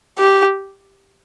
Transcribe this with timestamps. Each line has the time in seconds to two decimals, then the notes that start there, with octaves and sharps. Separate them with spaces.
0.18 G4